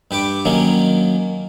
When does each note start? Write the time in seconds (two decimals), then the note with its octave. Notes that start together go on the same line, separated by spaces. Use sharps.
0.11 G2 G4 B4 D6
0.45 D#3 F#3 A#3 C#4